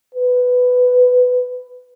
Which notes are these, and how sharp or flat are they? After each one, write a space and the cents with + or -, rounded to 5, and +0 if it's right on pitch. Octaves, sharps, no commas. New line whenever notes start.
B4 +10